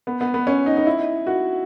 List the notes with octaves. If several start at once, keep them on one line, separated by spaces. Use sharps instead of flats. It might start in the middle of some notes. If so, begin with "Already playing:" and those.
B3
B3
B3
C#4
D#4
D#4
E4
F#4